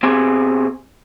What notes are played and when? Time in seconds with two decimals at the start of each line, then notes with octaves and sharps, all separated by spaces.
0.03 B2 C4 G4 G#4 G#5